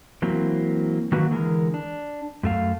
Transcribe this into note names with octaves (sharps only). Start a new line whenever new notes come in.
E3 F#3 A#3 C4
D#3 F#3 A#3 F#4 B4
D3 E3 G#3 A#4
D4
F#2 A3 F5